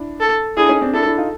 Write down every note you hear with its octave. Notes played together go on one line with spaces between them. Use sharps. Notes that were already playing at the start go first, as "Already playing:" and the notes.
Already playing: D4 E4
A4
D4 E4 G#4
C#4 D#4
C4 D4
D4 E4 A4
D4 E4
D#4 F4